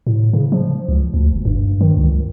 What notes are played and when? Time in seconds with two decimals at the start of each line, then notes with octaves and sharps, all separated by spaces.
0.07 A2
0.33 C#3
0.52 F3
0.89 C#2
1.14 D2
1.33 G1
1.45 G2
1.81 D#3
1.97 C#2